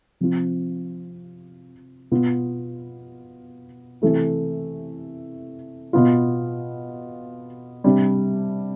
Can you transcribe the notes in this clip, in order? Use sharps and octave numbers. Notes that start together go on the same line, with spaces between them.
C3 F3 C4 F4
B2 B3 F4
C3 E3 A3 E4
B2 B3 F4
C3 G3 D4